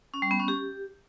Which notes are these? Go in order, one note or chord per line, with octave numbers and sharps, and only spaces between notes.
C#4
G3
B3
C#4
G4